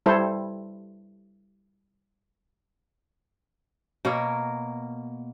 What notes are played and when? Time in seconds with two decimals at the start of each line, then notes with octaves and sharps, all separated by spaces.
0.06 G3 E4 A4 C5
4.05 B2 A#3 A#4 C#5